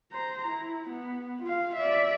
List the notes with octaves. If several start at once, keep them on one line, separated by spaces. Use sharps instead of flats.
C5 A#5
E4
B3
F4 F5
D5 E5